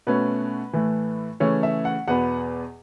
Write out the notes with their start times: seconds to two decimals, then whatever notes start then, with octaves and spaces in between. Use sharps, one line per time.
0.07 B2 A3 C#4 B4
0.73 A2 E3 A3
1.40 C#3 E3 A3 C#4 C#5
1.63 E5
1.85 F#5
2.08 E2 B2 B3 F#5